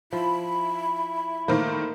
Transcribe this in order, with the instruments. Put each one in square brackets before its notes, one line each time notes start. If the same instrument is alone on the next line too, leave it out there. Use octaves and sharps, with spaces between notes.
[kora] F3 [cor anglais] E4 [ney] B5
[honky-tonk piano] A2 D#3 C5 [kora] A#3